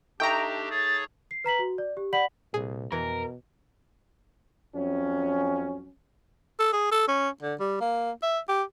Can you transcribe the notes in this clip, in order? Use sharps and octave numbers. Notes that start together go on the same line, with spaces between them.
A3 D4 D#4 G4 G5 A#5 C#6
G#4 C#5 A6
C7
B4 A#5 B6 F#7
F#4
D5
G4
D5 F#5 B5 B6 F#7
C2 A#2 G#4
F2 B2 E3 A#4
F2 F#3 C#4
A4
G#4
A4
C#4
D3
G3
A#3
E5
G4